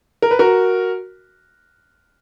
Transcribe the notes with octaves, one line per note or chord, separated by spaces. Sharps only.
A#4
B4
F#4 A#4